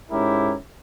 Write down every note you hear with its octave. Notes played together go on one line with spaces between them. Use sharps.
G#2 C#4 E4 G4 A#4